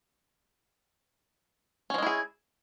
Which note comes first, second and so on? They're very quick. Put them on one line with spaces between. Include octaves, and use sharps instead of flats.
C#4 F3 G#3 E4 G#4